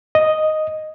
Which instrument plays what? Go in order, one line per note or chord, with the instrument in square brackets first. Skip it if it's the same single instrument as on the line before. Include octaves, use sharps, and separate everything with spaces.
[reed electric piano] D#5